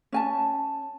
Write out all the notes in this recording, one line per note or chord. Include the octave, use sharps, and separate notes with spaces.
C#4 G#5 A5